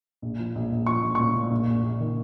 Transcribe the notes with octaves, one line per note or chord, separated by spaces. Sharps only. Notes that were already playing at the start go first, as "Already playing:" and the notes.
A#1
F3
A#1
A#1
F3 C#6
A#1
A#2 C#6
A#2
A#1
A#1
A#1
D#3